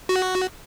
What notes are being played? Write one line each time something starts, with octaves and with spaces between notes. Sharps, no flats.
F#4